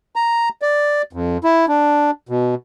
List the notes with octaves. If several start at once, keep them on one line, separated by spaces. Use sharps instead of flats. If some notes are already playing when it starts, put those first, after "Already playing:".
A#5
D5
F2
E4
D4
B2